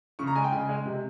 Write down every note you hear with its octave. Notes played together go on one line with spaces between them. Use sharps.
C#3 C#6
A#5
G#3 G#5
G5
C#3 G#5
G#3
C3